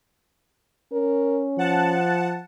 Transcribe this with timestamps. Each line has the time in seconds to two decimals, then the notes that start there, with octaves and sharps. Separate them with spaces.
0.92 C#4 A#4
1.58 F3 F#5 A5